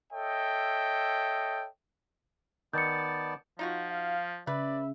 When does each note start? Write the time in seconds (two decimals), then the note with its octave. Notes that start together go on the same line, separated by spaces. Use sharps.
0.12 A4 C#5 D#5 E5 G5
2.73 D#3 B3 D5 A5 G6 C#7
3.59 F3 D#4 F4 F#4
3.90 F5
4.47 C#3 B4 D5 E5